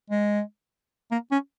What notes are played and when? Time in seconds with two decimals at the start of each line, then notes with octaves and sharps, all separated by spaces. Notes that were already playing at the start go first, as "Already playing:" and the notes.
0.10 G#3
1.12 A#3
1.32 C#4